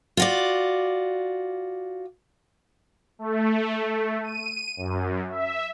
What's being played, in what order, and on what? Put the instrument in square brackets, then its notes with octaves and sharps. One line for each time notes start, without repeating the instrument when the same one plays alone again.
[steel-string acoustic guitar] F4 F#4 D5
[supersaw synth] A3
D#7
F#2
E5